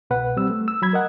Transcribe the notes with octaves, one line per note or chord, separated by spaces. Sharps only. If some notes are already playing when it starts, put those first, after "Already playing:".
C2 B2 B4 F#5
G3 C4 E6
A3
E6
F#3 B5 G#6
A#4 D#5 F#5